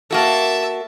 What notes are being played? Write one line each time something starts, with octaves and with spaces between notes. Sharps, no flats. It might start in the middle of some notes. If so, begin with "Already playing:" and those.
A#3 F#4 A4 E5 A5